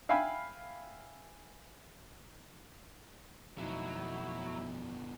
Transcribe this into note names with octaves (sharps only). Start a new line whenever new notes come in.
E5 F5 G5 G#5 B5
F2 B2 F#3 A3 D#4 E4